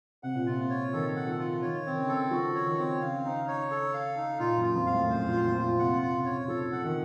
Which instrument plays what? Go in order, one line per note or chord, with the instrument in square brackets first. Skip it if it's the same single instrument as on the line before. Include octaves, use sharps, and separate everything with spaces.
[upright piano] C3 [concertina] F#5
[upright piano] A#2
[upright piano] C3 [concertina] F4
[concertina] C#5
[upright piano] D#3 [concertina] A4
[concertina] F#5
[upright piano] F3
[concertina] F4
[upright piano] D#3 [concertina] C#5
[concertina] C4
[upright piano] D#3
C#3
[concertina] A4
[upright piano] F3 [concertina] F#4
[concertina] C#5
[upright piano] D#3
[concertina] C4
[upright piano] C#3 [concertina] F5
[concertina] D#4
C#5
A4
F5
D#4
[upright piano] A#2 [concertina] F4
[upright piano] F#2
[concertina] F4
[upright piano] F2
[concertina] F5
[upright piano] A2
[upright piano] F#2 [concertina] C5
[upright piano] A#2
[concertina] F4
[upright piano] F2
[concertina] F4
[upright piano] A#2
[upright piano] C3 [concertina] F#5
[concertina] F4
[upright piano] C#3
[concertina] C#5
[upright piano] F3 [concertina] A4
[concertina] F#5
[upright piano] D#3